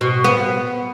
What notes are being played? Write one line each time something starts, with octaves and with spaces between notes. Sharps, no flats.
B2
B3